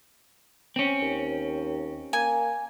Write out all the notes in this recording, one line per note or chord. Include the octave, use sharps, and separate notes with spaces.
C4 C#4
D#2
A#3 G#5